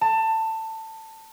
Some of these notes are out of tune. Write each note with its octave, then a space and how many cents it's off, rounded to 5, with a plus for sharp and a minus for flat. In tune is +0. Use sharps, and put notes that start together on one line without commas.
A5 +20